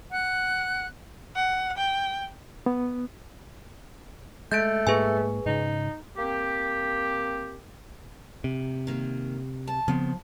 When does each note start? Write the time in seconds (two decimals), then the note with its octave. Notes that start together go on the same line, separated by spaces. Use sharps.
0.11 F#5 F#6
1.36 F#5
1.78 G5
2.66 B3
4.52 G#3 A3 G6 A6 D7
4.87 G#2 G#3 A#3 G#4 B4 G#5
5.46 G#2 C#3 D#4
6.18 A#3 C4 G4
8.44 C3
8.87 D#3 A#3
9.67 A5
9.88 C#3 F3 B3 C4